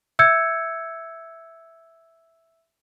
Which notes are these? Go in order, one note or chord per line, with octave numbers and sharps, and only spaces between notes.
E5 E6 G6 G#6 C#7